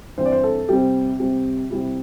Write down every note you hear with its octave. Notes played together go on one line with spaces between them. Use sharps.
G2 E3 C4 C5
D5
C5
A4
C3 G3 C4 G4
C3 G3 C4
C3 G3 C4 E4